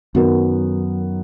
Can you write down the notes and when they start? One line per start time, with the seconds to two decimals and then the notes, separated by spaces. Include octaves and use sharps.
0.15 F#2 D#3 F#3 B3 F#4 A#4